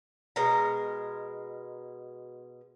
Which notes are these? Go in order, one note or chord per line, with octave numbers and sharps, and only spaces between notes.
B2 G#3 A#4 A#5